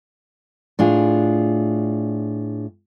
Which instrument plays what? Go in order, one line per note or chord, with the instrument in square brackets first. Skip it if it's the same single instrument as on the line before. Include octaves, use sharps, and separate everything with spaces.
[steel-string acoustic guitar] A2 D4 F4 G#4